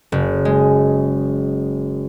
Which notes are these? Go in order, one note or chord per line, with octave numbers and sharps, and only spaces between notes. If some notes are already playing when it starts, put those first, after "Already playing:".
F#1
G#3